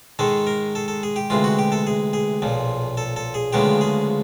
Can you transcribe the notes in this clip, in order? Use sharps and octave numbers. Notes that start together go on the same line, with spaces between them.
G#2 D#3 G#3 A4
A#4
A4
A4
G#4
G4
D2 C3 E3 G#3 F4
F#4
G4
A4
G#4
G#4
B1 A#2 F3
A4
A4
G#4
D2 C#3 F3 G#3 B3 G4
G#4